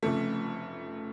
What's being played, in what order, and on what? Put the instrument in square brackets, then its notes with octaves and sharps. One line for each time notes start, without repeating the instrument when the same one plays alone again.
[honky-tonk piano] F1 F2 C#3 F3 A3